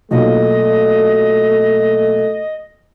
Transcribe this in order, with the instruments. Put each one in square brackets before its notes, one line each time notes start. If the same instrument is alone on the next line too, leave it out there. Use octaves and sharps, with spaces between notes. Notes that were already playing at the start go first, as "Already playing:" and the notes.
[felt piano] B1 A#2 [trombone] A3 [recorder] D#5